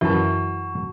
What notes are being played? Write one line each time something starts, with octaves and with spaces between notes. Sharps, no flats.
F#2 E3 E4 F#4 A5